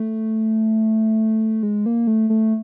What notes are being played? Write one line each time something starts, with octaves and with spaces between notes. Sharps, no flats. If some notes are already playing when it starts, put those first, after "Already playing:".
Already playing: A3
G#3
A#3
A3
A3